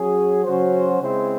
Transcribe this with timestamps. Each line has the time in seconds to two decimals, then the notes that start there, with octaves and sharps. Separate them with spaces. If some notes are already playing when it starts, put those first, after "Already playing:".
Already playing: F#3 C#4 G#4
0.44 C#3 F#3 C#4 F#4 C5
1.00 C#3 G#3 C4 E4 C5